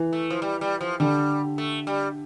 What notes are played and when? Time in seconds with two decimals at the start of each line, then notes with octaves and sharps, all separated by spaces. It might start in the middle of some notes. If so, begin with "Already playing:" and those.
Already playing: E3
0.13 A3
0.30 F3
0.42 G3
0.61 G3
0.81 F3
1.00 D3 G3
1.58 A3
1.87 G3